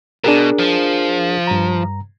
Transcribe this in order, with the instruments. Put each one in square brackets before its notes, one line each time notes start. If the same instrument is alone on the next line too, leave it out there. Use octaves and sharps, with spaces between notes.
[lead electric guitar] B2 [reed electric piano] D4 G#4 A#4
[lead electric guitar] F3
[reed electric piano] G2 A#5